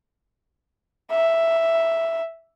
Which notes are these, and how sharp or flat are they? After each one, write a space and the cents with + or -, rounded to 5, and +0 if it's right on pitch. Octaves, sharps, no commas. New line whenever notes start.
E5 +5